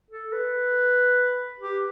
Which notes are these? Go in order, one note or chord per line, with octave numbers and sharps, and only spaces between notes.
A4
B4
G4